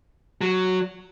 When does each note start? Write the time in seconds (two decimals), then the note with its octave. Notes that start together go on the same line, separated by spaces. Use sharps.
0.41 F#3